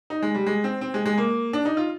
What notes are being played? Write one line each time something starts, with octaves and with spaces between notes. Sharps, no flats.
D#4
G#3
G3
G#3
C4
C4
G#3
G#3
A#3
D4
D#4
F4